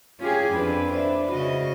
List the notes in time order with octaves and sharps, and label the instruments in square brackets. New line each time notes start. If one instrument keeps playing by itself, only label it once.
[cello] C#4 G#4 [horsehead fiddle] F4 G4
[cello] F2 [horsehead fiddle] D4 B4
[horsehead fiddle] D4 B4 [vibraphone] C5 D5 E5
[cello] C#3 D#5 [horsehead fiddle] F#4